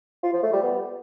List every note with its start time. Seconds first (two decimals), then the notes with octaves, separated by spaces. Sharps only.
0.23 F4
0.33 F3
0.43 A3
0.53 G3
0.63 B3